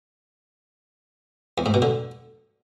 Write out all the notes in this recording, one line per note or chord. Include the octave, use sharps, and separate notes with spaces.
E2
G#2
B2
D3